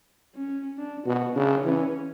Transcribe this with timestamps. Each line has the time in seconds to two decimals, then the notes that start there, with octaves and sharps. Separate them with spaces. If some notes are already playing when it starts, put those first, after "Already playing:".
0.35 C#4
0.78 D4
1.06 B2 F#4
1.36 C#3 D4
1.64 E3 C#4